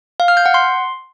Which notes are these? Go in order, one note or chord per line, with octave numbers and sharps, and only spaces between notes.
F5
F6
G6
F#5
C6